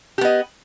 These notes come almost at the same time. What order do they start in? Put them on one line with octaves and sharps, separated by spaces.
G4 B3 D#5